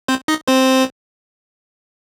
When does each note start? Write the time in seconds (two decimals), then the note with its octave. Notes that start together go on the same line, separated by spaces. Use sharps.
0.08 C4 C5
0.28 D#4 D#5
0.47 C4 C5